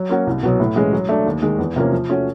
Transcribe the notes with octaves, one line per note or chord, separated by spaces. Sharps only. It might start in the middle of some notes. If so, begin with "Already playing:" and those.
Already playing: F#3
A#3 C#4 F#4
C2
B2 F#3
A2
E3 G#3 C#4
F#3
A3 D4
D#2
D#3 G#3
E2
C3 F3 A#3 C#4
F3
A3 C#4 F#4